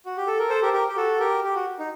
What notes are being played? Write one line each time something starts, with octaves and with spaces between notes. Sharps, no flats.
F#4
G4
A4
A#4
A4 C5
G4 A#4
G4 A#4
G4
F#4 A4
G4 A#4
G4
F#4
D#4